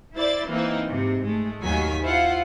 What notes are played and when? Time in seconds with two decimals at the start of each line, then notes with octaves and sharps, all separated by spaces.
0.16 E4 C5 D5 A6
0.50 E3 A#3 C4 D#4 E4
0.89 G#2 C3
1.25 G#3 A3
1.61 D#2 D#3 F#3 A#4 G#5 B6
2.02 E4 F4 C5 F5 F#5